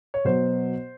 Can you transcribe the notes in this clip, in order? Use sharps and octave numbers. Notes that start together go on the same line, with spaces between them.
C#5
B2 F#3 C5